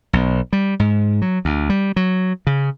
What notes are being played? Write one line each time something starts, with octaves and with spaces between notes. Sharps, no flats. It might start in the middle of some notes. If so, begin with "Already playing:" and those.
B1
G3
G#2
F#3
D2
G3
F#3
C#3